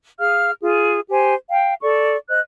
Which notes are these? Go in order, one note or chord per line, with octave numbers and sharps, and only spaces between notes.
G#4 F5 F6
F4 G#4
G4 C5 G#5
F5 G5
A4 D5 C#6
C5 D#5 F#6